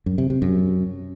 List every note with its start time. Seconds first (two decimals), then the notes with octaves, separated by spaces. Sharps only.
0.06 F#2
0.18 C3
0.30 C3
0.42 F#2